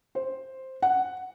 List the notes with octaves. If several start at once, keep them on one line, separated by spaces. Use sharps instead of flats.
C5
F#5